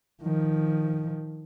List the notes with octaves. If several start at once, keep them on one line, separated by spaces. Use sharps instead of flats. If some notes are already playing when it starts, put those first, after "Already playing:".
D#3 F3